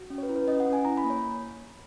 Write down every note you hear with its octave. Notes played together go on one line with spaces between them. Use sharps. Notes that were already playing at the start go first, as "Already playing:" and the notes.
Already playing: F#4
C#4
C#5
B4
E4
B4
C#4 D#5
F#5
C#4
G#5
E4 A#5
B5
A#3
C#5